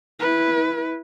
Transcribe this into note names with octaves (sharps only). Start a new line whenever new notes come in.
E4 B4